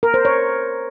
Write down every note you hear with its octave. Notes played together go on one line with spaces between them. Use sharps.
A#4
C5
C#5